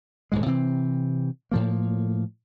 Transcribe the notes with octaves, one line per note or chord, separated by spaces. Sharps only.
D#1 D2 G#2 G#3
C3 E3 C4
A2 F3 A#3